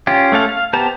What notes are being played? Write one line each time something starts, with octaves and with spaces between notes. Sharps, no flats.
C#4 F4 G4
A3 C#4 A4 F5
F5
B3 G4 C5 A5 A#5